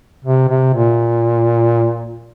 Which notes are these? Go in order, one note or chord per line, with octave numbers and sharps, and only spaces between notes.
C3
C3
A#2